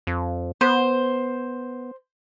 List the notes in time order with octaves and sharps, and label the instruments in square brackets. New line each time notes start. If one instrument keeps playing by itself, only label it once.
[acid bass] F2
[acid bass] B3 [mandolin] C5